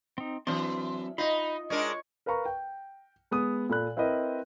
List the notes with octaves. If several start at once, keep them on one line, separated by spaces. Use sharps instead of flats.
C4 D#4
E3 F#3 C4 D4 C6
D#4 F4 D#5 B5
G#3 D4 A#4 C#5
A#4 B4 F5 A#5 C#6
G5
G#3 B3 D#6
A#2 A4 B5 F#6
C4 E4 A#4 B4 D#5